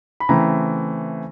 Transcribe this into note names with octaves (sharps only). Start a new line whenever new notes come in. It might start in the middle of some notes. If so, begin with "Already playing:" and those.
B5
C#3 E3 A3 C4 A#5